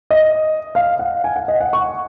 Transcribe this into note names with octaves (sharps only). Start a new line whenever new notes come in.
D#5
F5
F#5
G#5
F#5
D#5
F#5
C#6